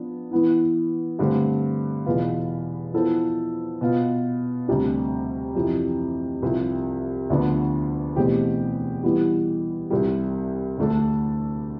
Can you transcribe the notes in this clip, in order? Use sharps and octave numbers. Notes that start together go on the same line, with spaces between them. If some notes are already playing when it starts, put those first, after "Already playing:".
Already playing: F3 B3 D4
E3 B3 E4
G2 D3 A3 C4
E2 B2 B3 F4 B4
F3 B3 E4 A4 C5
B2 B3 F4
D2 C3 G3 D4
F2 C3 E3
C2 C3 F3
D2 D3 F3 B3 D4
E2 B2 A3 C4 G4
E3 G3 B3
C2 C3 G3
D2 D3 A3 D4 A4